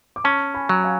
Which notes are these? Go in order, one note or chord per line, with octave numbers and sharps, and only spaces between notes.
D6
C#4 A5 C#6
G#5 B5
F#3
F5 G#5